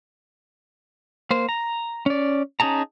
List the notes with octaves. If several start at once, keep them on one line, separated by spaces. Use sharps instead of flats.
A#3 C5
A#5
C#4 D5
C#4 D#4 G#4 A5 A#5